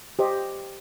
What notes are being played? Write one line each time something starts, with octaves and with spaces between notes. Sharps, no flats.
G4 C5 D#5